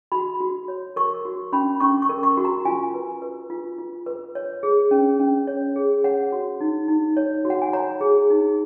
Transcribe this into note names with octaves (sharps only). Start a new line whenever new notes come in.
F#4 B5
F#4
C#5
A#4 C#6
F#4
C#4 B5
C#4 C#6
C#6
A#4
C#6
F#4
A#5
F4 G#5
B4
B4
F4
F4
B4
C#5
G#4
C#4
C#4
C#5
G#4
C#5 F#5
F#4
D#4
D#4
C#5
F#4
F#5
G#5
C#5 A#5
G#4
D#4